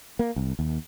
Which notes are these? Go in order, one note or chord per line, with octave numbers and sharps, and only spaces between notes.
A#3
C2
D#2